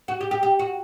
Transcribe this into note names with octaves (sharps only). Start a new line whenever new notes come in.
F#4
G4
G4
G4
F#4